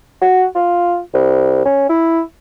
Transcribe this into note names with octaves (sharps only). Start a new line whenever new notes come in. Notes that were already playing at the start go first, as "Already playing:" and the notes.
F#4
F4
C2
C#4
E4